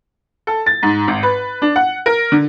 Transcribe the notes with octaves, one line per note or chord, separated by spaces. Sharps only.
A4
A6
G#2
G#1
B4
D4
F#5
A#4
D3